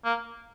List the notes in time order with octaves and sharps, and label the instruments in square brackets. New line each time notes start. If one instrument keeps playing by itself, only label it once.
[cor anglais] A#3